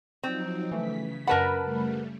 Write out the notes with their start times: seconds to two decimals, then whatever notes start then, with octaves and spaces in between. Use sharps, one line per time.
0.23 F3 F#3 C4 D#4
0.71 C#3 E3 A3 B6
1.27 F#2 A#4 B4 F#5 A5 B5
1.62 C#3 G3 A3